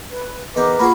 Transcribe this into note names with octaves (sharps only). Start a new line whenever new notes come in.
B4
E2 D#4 A#4 B4 G5 D6
A#3 F4 F#4 G#4 B5